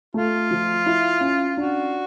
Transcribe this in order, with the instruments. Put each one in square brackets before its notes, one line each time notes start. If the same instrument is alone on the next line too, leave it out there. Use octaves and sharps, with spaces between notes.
[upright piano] A3 [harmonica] F4
[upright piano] F3
E4
C#4
[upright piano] D4 [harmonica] F#4